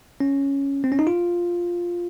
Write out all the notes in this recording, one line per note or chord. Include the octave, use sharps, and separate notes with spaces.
C#4
C4
C#4
D#4
F4